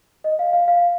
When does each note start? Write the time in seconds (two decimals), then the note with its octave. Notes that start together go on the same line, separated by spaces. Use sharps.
0.24 D#5
0.39 F5
0.53 F5
0.68 F5